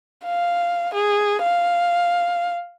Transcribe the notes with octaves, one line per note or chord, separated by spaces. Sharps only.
F5
G#4
F5